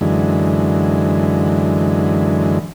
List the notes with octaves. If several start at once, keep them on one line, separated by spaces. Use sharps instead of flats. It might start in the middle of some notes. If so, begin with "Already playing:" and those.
F#2 D3 E3 G#3